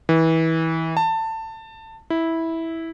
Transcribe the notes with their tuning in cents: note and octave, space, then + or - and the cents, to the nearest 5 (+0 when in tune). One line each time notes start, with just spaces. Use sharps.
E3 -25
A5 +20
E4 -10